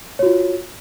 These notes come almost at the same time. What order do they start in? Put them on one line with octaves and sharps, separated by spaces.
C#5 F#4 F4